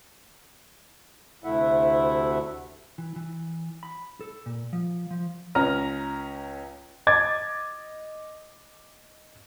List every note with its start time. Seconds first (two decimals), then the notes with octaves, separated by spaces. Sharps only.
1.44 D2 C3 A3 E4 E5 F#5
2.98 E3
3.16 E3
3.83 B5
4.21 A4
4.46 A#2
4.73 F3
5.11 F3
5.55 C#2 C#4 A#5 F6
7.07 D#5 D6 G#6 A6